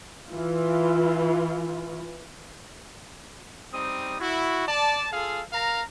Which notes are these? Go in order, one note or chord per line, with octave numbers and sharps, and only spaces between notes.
E3 F4
G3 C4 D#4 D#6
E4 F#4
D5 A5
F4 G#4 A4 F5
A#4 F5 A#5